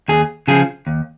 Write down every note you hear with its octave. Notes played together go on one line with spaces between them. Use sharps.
D#2 G#4
C#3 F3 G#4
D#2